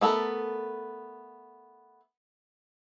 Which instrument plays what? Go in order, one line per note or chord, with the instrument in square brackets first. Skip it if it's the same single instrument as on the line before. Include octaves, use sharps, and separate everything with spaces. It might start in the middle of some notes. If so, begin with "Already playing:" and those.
[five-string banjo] A3 B3 A4 A#4